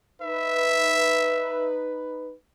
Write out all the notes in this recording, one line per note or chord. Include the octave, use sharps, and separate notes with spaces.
D#4 B4 E5